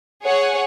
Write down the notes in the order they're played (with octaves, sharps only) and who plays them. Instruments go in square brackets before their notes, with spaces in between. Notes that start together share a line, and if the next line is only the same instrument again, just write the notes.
[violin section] G#4 C#5 F#5